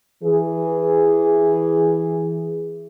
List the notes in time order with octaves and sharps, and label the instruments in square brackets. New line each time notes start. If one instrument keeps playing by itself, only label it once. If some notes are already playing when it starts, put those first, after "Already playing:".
[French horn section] E3 G#4